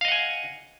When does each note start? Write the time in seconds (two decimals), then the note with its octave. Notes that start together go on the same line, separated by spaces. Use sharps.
0.01 F5
0.05 D#5
0.08 F#5
0.12 G#5